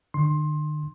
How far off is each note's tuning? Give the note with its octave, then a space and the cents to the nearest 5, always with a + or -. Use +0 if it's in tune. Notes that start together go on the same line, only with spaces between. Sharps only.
D3 +45 C6 +20